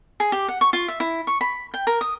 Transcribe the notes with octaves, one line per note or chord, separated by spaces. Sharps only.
G#4
G4
F#5
C#6
F4
E5
E4
C#6
B5
G5
A#4
D#6